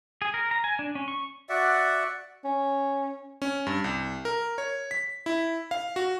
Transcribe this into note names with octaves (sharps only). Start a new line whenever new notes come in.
G#4
A#4
A#5
G#5
D4
C#4
C#6
F#4 D5 E5 F#5
C#4
C#4
G2
C2
A#4
C#5
B6
E4
F5
F#4